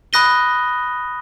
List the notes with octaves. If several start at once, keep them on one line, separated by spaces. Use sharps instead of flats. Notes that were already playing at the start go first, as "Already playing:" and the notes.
B5 D#6 F#6 A#6 D#7 G7